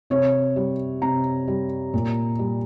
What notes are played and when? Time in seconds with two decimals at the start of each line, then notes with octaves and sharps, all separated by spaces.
0.10 C3 C#5
0.56 G3
1.02 C3 A#5
1.48 G3
1.94 A#2
2.39 G3